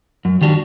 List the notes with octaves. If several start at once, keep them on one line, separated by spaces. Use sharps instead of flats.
F#2
D#3 G3 D4 F#4